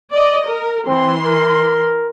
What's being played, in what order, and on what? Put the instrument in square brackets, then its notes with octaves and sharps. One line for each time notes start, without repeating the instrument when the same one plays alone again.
[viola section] D5 D#5
A#4
[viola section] E3 C6 [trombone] C4
[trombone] A#4